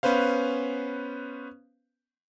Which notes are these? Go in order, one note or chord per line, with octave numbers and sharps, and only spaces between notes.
B3 C#4 B4 C5 F5